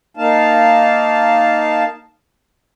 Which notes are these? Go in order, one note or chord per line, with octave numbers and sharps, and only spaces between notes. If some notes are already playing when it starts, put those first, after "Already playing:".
A#3 D#4 F5 A5